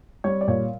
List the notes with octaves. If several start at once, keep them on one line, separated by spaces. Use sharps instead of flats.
G3 C#5
D5
A#2 C#5